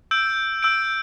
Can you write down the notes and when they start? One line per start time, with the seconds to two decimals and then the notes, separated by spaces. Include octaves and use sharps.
0.11 E6 G6 D7
0.62 E6 G6 D7